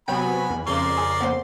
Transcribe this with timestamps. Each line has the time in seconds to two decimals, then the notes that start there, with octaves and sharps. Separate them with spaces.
0.08 C3 F#3 B3 G5 G#5 B5
0.50 E2
0.67 F2 C#3 A#4 D5 C6
0.97 G#4
1.21 A#3 B3 C5